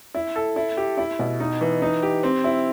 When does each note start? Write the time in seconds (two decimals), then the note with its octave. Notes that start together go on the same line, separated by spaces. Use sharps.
0.14 E4
0.36 A4
0.56 E4
0.77 G4
0.97 E4
1.19 B2
1.40 D#4
1.61 E3
1.82 D#4
2.02 G4
2.23 C4
2.44 E4